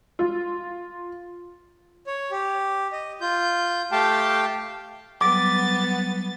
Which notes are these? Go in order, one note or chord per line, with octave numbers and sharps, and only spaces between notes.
F4
C#5
G4
D#5
F4 G6
A3 G4 F5 G5 A5
F#3 G3 B3 D6 A6